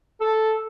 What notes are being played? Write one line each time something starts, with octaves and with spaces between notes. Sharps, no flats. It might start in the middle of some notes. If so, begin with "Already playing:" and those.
A4